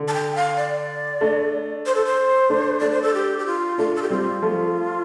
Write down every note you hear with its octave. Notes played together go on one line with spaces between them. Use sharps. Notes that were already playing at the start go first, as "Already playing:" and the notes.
Already playing: D3
A5
G5
F5
D5
A3 D4
C5
A4
C5
A3 D4
A3 D4 D5
C5
A4
G4
G4
F4
A3 D4 F4
A4
G4
G3 C4 F4
F3 A3